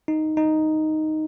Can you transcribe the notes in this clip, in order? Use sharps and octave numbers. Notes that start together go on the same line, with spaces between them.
D#4
D#4